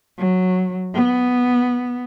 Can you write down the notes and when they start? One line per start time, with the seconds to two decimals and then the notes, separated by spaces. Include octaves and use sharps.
0.19 F#3
0.93 B3